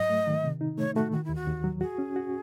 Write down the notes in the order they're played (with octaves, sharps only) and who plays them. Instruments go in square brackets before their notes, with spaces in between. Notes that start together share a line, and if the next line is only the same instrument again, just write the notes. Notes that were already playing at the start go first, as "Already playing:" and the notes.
Already playing: [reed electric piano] G#2 F#3 [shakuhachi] D#5
[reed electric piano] A3
D#3
C3
D#4
[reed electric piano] A3 [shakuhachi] C#5
[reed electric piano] A3 [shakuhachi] F#4
[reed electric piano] D#3 [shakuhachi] F#4
[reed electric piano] D#2 [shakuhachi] E4
[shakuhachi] F#4
[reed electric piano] D#2
F#3
[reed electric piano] F#4 [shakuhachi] G#4
[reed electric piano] C#4
F#4